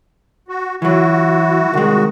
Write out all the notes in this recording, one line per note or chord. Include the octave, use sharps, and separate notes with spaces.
F#4
E3 F#3 E4 F#4
C2 D#3 G#3